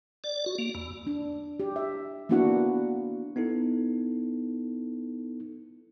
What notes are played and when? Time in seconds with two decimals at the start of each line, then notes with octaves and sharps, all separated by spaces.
0.24 D5
0.46 F#4
0.58 A#3
0.75 E2
1.07 D4
1.60 G4
1.76 E5
2.29 A#3 B3 D4 E4 F#4 F#5
3.36 B3 D#4 E4 A4